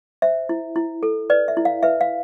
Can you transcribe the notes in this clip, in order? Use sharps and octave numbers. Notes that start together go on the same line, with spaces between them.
C5 E5
E4
E4
A4
B4 D5
E5
E4
F5
B4 E5
F5